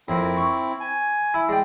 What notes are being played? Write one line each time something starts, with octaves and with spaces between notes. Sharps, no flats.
F2 A#3 C4 E4
C#6
G#5
E4
G#3 D5 G5